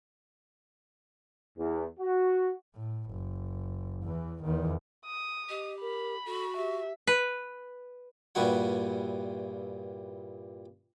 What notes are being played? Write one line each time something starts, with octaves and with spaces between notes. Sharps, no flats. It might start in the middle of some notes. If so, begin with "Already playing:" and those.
E2
F#4
A2
F#1
E2 E3
E2 D#3
D#6
G4 D#5
A#4 B5
F#4 A4
G4 E5
B4
G2 A#2 E3 G3 F#4 F#5